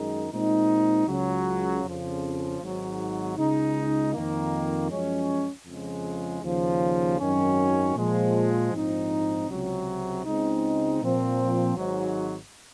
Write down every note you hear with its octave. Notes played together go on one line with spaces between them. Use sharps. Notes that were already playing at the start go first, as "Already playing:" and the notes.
Already playing: F#2 D#3 G#3 D#4
A#2 G#3 C4 D#4
C#2 C#3 F#3
F2 C#3 F3
G#1 G#2 F#3
C#2 C#3 G#3 D#4
F2 D#3 A#3
F#2 F3 G#3 C#4
F2 C#3 F3 G#3
D#2 C#3 F3
G#1 F#2 D#3 F#3 C#4
A#2 F3 G#3
A#1 G#2 F3 C4 D#4
C#2 C3 F#3
C#2 C#3 G#3 C4 D#4
A#2 F3 C4
G#1 G#2 F#3